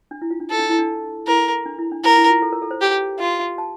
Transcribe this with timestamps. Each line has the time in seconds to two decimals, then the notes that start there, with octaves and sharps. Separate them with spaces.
0.11 D4
0.22 E4
0.31 F4
0.40 D4
0.50 E4 A4
0.59 D4
0.69 E4
0.79 D4
1.27 E4 A#4
1.66 D4
1.79 E4
1.92 D4
2.04 E4 A#4
2.17 E4
2.30 F4
2.42 A4
2.52 A#4
2.62 A4
2.71 C5
2.81 G4
3.19 F4
3.58 A5